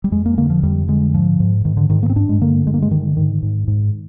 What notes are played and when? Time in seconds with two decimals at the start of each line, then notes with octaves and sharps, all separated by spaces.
0.04 G3
0.12 F2 G#3
0.26 A#3
0.38 D3 A#3
0.50 F3
0.63 F2 G3
0.88 D3 G#3
1.14 G#2 F3
1.40 G#2
1.65 G#2 D#3
1.77 D3
1.90 G#2 D#3
2.03 A#3
2.10 C4
2.16 G2 D4
2.29 G#3
2.41 D3 A#3
2.66 G2 G#3
2.74 A#3
2.82 G#3
2.91 D3 D#3
3.17 G#2 D#3
3.43 G#2
3.68 G#2